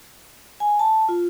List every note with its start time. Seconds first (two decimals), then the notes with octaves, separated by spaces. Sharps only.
0.60 G#5
0.79 A5
1.09 F4